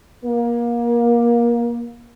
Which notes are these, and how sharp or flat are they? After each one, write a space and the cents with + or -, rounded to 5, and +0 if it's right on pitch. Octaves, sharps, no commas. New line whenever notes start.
A#3 +25